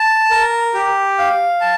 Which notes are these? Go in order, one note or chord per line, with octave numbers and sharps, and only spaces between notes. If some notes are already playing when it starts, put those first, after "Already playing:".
Already playing: A5
A#4
G4
F5
A5